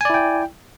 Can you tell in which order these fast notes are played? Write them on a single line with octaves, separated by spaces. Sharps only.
G#5 D5 E4 G5